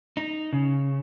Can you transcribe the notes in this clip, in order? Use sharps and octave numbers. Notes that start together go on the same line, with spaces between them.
D#4
C#3